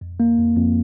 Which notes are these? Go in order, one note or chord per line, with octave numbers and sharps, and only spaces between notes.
F2
A#3
F2
F2